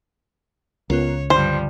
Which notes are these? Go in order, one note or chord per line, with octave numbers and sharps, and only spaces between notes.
C#2 B3 F4 A#4 C#5
G2 D3 F3 G3 C5